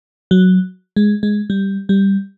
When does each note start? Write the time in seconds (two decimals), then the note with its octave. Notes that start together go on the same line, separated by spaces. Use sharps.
0.31 F#3
0.96 G#3
1.23 G#3
1.50 G3
1.89 G3